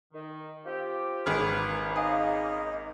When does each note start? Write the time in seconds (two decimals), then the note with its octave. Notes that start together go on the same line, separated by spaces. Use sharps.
0.13 D#3
0.65 C4 F4 G4
1.26 G#1 C#3 A#3 G#4 B4 F6 G#6 D7
1.96 D#4 F5 G#5 D#6